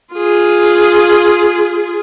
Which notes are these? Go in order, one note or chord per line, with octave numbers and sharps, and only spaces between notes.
F4 G#4